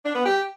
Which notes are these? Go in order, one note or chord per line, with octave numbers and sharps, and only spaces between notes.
D4
B3
G4